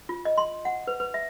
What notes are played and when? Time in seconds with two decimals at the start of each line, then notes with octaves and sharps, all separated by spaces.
0.09 F4
0.25 D#5
0.37 C6
0.65 F#5
0.87 B4
1.00 B4
1.14 E5